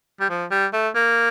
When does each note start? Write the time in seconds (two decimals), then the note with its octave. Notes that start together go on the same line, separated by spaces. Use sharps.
0.21 G3
0.30 F3
0.51 G3
0.73 A3
0.95 A#3